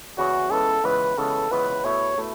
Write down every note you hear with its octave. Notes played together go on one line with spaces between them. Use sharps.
E2 C#3 E3 C#4 F#4
C#2 C#3 E3 B3 A4
C#2 C#3 E3 B3 B4
C#2 C#3 E3 B3 A4
C#2 C#3 E3 B3 B4
B2 A3 E4 C#5
B2 A3 E4